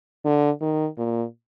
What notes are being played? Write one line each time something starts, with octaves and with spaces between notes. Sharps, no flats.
D3
D#3
A#2